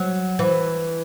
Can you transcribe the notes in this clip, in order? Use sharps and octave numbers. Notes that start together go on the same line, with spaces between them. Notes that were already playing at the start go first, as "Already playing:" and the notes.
Already playing: F#3
E3